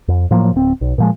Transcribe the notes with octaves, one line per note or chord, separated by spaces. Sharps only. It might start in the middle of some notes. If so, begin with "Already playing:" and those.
F2
A2 F3 F#3 A#3
D1 C4
B1
A#2 F3 G#3